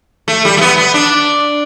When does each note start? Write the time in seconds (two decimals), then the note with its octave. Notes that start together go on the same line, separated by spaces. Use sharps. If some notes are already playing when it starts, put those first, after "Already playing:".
0.28 A3
0.45 G3
0.57 A3
0.61 B3
0.78 B3
0.94 D4